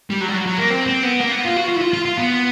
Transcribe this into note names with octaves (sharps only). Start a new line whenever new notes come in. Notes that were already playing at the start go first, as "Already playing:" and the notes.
G3
F#3
G3
F#3
F#3
A#3
C4
C4
B3
A#3
B3
F4
F#4
F4
E4
F4
F4
F4
B3